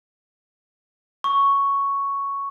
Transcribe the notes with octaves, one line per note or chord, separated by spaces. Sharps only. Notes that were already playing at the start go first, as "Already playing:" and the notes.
C#6